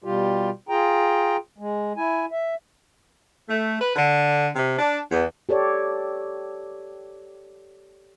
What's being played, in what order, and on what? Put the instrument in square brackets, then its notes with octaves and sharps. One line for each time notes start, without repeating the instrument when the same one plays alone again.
[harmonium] B2 G3 F4 G4
F4 G#4 G5 A#5
G#3
E4 G#5
E5
[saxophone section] A3
B4
D3
C3
D4
E2
[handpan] G4 A4 C#5 D5